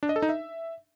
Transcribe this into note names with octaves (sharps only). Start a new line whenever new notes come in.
D4
D#5
A4
D#4
E5